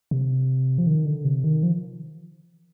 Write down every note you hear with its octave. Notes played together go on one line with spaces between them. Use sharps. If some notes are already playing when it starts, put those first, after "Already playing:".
C3
F3
D#3
D3
C3
D#3
F3